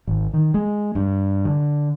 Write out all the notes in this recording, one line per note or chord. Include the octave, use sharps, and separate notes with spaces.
G#1
D#3
G#3
G2
D3